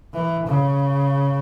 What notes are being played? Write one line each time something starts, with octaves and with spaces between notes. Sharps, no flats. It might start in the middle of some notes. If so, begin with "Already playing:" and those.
E3
C#3